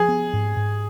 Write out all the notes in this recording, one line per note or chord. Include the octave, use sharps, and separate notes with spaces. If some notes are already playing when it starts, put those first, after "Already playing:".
Already playing: F3 G#4
B3
G#2
G#2